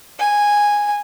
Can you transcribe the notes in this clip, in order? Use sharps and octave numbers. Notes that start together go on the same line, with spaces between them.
G#5